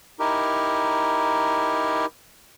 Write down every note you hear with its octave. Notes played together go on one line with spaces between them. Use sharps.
D#4 E4 G4 A#4